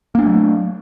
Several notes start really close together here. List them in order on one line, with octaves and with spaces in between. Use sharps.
A#3 D4 A3 F#3